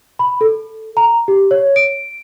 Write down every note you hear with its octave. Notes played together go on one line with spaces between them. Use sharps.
B5
A4
A#5
G4
C#5
D7